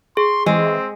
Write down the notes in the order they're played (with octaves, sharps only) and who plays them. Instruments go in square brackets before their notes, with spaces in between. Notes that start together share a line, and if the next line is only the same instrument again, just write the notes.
[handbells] G#4 [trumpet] C6
[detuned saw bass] E3 [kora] G#3 [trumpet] C4